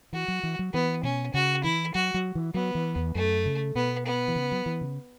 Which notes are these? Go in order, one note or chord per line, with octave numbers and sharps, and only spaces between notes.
E3 F#4
F#3
E3
F#3
E3 B3
B2 C#4
C#3 F#4
E3 E4
F#3 F#4
F#3
E3
F#3 B3
E3
E2
F#2 A3
C#3
B2 B3
B3
E3
C#3
F#3
E3
C#3